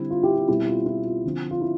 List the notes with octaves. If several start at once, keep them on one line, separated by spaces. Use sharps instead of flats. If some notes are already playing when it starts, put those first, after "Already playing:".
Already playing: D3 G3 C4 E4
F4
E4 G4
F4
B2 G3 C4 E4
F4
E4
F4
D3 F3 C4
F4
E4